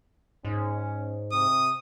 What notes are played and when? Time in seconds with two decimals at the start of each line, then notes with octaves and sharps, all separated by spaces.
0.45 G#2 C#4
1.31 C3 D#6